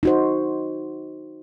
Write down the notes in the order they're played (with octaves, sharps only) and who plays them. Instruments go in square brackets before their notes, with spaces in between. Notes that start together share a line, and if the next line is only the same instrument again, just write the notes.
[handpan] D#4 F#4 C5